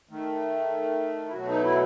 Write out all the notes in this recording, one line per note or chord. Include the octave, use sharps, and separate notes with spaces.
D#3 A3
E4
B2 F#3 A3 F#4
D#4
E4